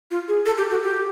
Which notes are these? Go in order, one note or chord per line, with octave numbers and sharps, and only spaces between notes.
F4
G#4
A4
G4
F#4
G4